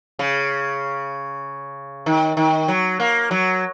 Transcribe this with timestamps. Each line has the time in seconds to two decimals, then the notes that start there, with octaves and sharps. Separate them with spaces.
0.19 C#3
2.06 D#3
2.37 D#3
2.68 F#3
3.00 A#3
3.31 F#3